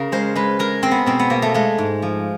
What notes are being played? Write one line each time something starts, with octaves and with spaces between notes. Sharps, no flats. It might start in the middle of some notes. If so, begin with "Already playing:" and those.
Already playing: C#3 A#4
G#3 C5
G#3 B4
G#3 A#4
G#3 C4
B3
B2 C4
B3
B2 A#3
A3
G#3 A3
G#2
F3